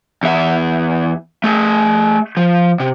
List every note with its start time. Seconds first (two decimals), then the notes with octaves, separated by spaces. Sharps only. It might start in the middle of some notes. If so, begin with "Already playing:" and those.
0.23 E2 E5
1.44 A3 G#4
2.37 F3
2.80 C3